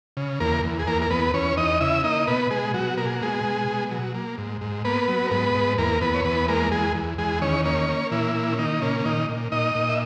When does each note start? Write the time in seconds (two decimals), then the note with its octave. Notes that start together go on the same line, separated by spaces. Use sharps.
0.17 C#3
0.40 E2 A#3 A#4
0.64 E2
0.79 G#4
0.87 E2 A#3 A#4
1.02 A#4
1.10 E2 B3 B4
1.34 E2 C#4 C#5
1.57 E2 D#4 D#5
1.81 C#3 E4 E5
2.04 A#3 D#4 D#5
2.27 B2 B3 B4
2.51 B2 G#3 G#4
2.74 B2 F#3 F#4
2.97 A#3 A#4
3.06 G#4
3.15 F#4
3.21 B2 G#3 G#4
3.44 B2
3.68 B2
3.91 F#3
4.14 A#3
4.38 G#2
4.61 G#2
4.85 A#3 B3 B4
5.08 F#3
5.27 A#4
5.31 G#2 B3 B4
5.54 G#2
5.78 E2 A#3 A#4
6.01 E2 B3 B4
6.14 C#5
6.25 E2 B3 B4
6.48 G#3 A#3 A#4
6.72 E2 G#3 G#4
6.95 E2
7.18 E2 G#3 G#4
7.42 D#3 C#4 C#5
7.65 A#3 C#4 C#5
7.89 A#3
8.11 A#2 E3 E4
8.35 A#3
8.53 C#4
8.59 D#3 A#3 D#4
8.81 A#2 C#3 C#4
9.00 C#4
9.05 A#2 D#3 D#4
9.29 A#2
9.52 A#2 D#4 D#5
9.75 A#2
9.89 E5